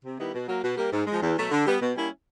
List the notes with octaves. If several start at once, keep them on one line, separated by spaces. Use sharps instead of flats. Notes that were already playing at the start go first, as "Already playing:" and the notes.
C3
D#3 G3 B3 E4
B2
F#3 A#3
B2
G3 A#3
G#2
F3 G#3
E2
B2 F#3 A3
D3
G3 B3
B2
G3 A#3 C#4 E4